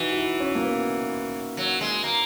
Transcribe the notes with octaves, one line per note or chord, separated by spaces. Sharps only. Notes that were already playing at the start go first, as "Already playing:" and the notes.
Already playing: E3 D#4 F#4
F#4
E4
C#4
A#3
B3
F#3
G#3
A#3